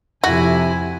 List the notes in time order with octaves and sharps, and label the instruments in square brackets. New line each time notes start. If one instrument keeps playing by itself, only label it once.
[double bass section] F2 [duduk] C3 [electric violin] E4 G#5 [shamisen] F#4